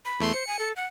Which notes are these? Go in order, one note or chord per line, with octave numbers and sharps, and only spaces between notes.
B5
E2 A3 C6
C5 C#7
G#5
A4
F#5